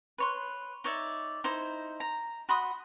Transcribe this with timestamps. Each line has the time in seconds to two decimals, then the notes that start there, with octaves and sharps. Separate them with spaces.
0.18 B4 C#5 C6
0.84 D#4 C#5 D5 E5
1.44 D#4 E4 C5
2.00 A#5
2.49 F#4 B5 C6 D#6